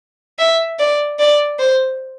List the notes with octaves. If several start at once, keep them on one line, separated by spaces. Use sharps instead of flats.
E5
D5
D5
C5